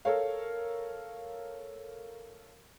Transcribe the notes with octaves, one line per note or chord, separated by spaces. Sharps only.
A4 A#4 C#5 F5